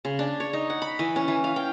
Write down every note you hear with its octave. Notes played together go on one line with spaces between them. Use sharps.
C#3
D4
C#5
D#4
F#5
B5
E3
C#4
E3
F5
G5